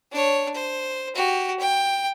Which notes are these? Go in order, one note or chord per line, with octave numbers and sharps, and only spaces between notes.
D4 C#5
C5
F#4 G4
G5